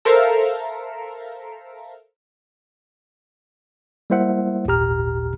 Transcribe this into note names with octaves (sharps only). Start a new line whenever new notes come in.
A4 A#4 C5 E5 F5 A#5
G3 A#3 E4 C5 E5 F#5
G#1 D#2 A#2 G4 A#5 F6